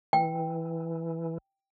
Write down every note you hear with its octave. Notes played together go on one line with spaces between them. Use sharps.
E3 G5